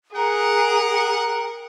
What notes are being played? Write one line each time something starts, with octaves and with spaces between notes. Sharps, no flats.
G#4 A#4 F#5 G5 A#5